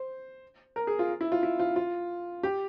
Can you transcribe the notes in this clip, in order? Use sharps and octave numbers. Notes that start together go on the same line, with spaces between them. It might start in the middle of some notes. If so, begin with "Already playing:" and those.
Already playing: C5
A#4
G#4
F4
E4
F4
E4
F4
F4
G4